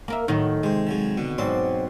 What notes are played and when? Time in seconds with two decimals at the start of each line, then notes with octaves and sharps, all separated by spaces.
0.08 A#3 A#4 E5
0.28 A2 D#3 F#3
0.63 C3 G#3 C5
0.87 F3 F#3 G#3
1.17 B2 D3
1.38 G#2 F#3 C4 D5 C6